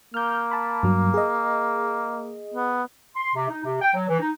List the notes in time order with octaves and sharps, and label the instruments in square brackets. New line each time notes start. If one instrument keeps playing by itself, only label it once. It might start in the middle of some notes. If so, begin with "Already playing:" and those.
[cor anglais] A#3 [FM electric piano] F6 G6
[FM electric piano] A5 B5
G2 F#3
G#4 D#5
[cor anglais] B3
[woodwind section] C6
C3
D#4
C3
G5
F#3
E3
D#4